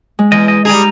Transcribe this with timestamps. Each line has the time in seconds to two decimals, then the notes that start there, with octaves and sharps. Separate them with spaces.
0.19 G#3
0.32 E2 D#5
0.48 D#5
0.65 G3 D#4 G#4 A#5